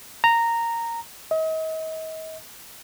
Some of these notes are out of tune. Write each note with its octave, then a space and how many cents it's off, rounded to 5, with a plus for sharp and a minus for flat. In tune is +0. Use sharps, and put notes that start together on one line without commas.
A#5 -10
D#5 +40